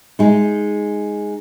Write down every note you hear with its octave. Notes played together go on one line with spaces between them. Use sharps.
G#3 D#4